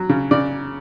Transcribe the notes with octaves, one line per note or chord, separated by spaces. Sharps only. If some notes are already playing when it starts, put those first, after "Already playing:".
Already playing: F#3
C#3
C#3 D5